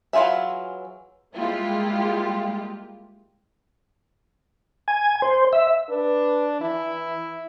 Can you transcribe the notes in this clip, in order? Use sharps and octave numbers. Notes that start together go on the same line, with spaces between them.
E3 F#3 F4 G#4 E5
G3 G#3 A#3 E4 F4 G4
G#5
C5
E5
D4 B4
E3 E4